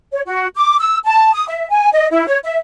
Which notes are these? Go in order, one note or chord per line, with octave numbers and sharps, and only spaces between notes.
C#5
F#4
D6
E6
A5
D#6
E5
G#5
D#5
E4
C#5
E5